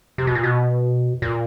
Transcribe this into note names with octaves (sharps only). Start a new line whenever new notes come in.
C3
B2
A#2
B2
A#2